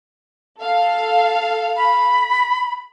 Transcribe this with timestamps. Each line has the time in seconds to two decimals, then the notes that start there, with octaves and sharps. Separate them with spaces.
0.59 A4 F5
1.77 B5